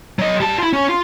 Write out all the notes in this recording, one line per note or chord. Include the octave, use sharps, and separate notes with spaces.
F#3 D#5
G3 A5
E4 F4
C#4 C#5
F4